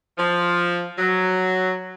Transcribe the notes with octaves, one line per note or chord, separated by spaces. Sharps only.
F3
F#3